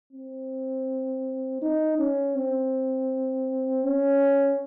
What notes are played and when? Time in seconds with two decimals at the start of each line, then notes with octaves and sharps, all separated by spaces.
0.13 C4
1.62 D#4
1.99 C#4
2.36 C4
3.85 C#4